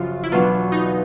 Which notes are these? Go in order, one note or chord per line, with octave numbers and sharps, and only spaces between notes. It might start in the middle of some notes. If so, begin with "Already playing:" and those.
Already playing: F#2 C#3 F3 F4
E4
E2 B2 F#3 B3 D4 F4
D#4